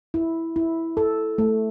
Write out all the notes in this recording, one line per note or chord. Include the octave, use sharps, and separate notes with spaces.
E4
E4
A4
A3